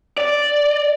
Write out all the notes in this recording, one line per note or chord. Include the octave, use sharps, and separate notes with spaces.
D5